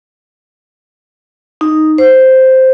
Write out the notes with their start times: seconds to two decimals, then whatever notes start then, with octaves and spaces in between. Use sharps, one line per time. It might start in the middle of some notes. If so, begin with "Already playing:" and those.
1.61 D#4
1.98 C5